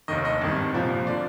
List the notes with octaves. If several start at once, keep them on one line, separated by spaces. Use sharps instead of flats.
F1 D#2 D#3 D#5
D#5
G#1 G2 D#3
C2 A#2 F3
D3 F3 D5